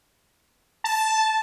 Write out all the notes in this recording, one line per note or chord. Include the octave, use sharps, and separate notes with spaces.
A5